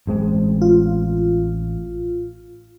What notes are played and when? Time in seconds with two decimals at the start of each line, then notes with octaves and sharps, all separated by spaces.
0.07 A1 G#3 C4
0.62 F4